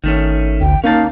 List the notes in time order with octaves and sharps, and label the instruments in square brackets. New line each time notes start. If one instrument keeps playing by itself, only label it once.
[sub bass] G#1 [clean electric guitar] D#3 A3 C#4
[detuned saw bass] D2 [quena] G5
[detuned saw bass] A#3 [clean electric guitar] C#4 D#4 A5 [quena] F5